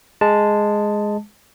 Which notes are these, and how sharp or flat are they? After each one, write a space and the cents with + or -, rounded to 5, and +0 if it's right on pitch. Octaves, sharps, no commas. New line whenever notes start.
G#3 +0 A5 +0